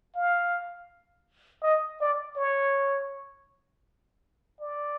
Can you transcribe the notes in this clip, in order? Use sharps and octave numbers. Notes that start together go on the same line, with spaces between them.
F5
D#5
D5
C#5
D5